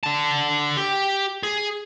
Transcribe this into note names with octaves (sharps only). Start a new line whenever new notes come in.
D3 A5
G4
G#4